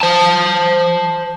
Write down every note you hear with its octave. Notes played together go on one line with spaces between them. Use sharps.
C5 A5